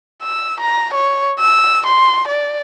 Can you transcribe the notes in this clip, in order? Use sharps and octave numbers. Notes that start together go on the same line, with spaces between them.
E6
A#5
C#5
E6
C6
D5